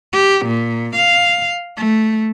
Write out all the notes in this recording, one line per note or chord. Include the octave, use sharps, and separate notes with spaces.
G4
A#2
F5
A3